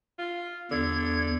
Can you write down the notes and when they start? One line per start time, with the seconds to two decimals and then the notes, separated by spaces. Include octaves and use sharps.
0.19 F4
0.71 E2 D3 G#6